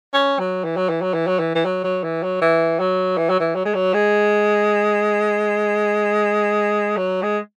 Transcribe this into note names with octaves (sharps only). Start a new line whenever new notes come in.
C#4
F#3
E3
F#3
E3
F#3
E3
F#3
E3
E3
F#3
F#3
E3
F#3
E3
F#3
E3
F#3
E3
F#3
G#3
F#3
G#3
F#3
G#3